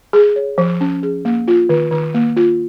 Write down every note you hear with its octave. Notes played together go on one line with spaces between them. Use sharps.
G#4
C#5
F3
C#4
G#4
A#3
F4
D#3
D#3
A#3
F4